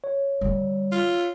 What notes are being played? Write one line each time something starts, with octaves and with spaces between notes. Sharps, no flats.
C#5
D3 G3
F4